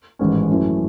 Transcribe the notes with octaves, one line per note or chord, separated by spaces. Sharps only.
A1 G#2 D#3 G#3 C#4
F#2 E3 A3 C#4